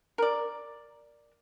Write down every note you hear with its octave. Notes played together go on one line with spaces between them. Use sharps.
A#4 D5